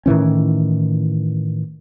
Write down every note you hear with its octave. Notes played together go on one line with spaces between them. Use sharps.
A2 D#3 E3 C#4